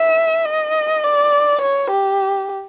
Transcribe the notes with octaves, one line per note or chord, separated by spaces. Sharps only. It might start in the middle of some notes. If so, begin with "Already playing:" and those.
Already playing: E5
D#5
D5
C#5
G4